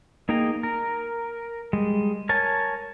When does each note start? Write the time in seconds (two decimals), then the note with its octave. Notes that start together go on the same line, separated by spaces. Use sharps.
0.29 A#3 D#4 G#4 G5 A#5
0.63 A#4
1.73 G3 G#3
2.29 A#4 C#5 G#5 A5